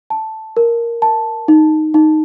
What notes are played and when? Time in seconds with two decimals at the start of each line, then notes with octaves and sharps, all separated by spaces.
0.10 A5
0.57 A#4
1.02 A5
1.48 D#4
1.94 D#4